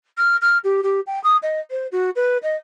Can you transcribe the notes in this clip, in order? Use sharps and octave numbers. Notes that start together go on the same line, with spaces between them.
F6
F6
G4
G4
G5
D#6
D#5
C5
F#4
B4
D#5